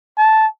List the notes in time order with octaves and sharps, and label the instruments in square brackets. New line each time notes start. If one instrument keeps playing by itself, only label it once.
[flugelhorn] A5